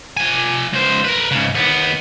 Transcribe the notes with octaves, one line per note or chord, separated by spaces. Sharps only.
F3 G#5
C#2 C5
A#4 B4
G#2 C#3
D#2 B3